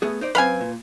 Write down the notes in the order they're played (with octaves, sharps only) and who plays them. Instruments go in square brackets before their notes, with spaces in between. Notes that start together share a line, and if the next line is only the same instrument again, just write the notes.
[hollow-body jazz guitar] A3 B3 G#4
D#4 C5 D5
[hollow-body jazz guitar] F#2 C4 [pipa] B4 F5 G#5
[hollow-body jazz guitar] A#2